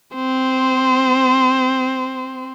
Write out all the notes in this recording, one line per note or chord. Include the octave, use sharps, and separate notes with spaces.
C4 C5